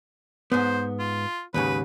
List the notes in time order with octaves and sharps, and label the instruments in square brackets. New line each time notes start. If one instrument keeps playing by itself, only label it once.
[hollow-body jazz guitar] G#2 B3 [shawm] C5
[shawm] F4
[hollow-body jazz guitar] D#2 G#2 C#3 [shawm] B4